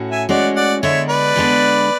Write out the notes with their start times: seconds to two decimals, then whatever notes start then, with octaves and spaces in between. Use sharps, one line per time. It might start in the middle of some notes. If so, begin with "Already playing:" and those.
Already playing: A2 C#4 F#4
0.11 E5 G#5
0.29 A2 G#3 C#4 F#4 D5 F#5
0.56 D5 F#5
0.83 D3 G#3 B3 D4 C#5 E5
1.09 B4 D5
1.36 D3 G#3 B3 D4